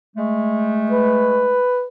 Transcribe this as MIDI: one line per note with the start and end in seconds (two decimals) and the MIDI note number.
0.16 1.63 56
0.16 1.63 57
0.90 1.85 71